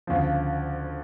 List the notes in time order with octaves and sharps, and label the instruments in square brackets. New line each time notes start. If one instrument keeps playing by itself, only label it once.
[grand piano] D2 C#3 F3